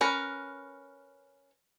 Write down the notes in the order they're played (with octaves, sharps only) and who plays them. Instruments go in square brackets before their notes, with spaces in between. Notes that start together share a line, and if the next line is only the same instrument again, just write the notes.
[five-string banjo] C#4 A#4 B4